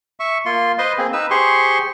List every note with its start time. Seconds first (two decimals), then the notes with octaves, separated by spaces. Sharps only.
0.20 E5 C#6
0.46 A#3 F4 C6
0.78 B4 C5 D#5 C6
0.98 A#3 C4 G#4
1.13 D#4 B4 E6
1.30 G4 G#4 C5 C6 C#6